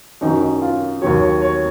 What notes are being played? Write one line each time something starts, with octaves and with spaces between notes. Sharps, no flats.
F#2 D#3 F#3 D#4
D#4
F4
D#2 D#3 F#3 C#5
C#5
C#5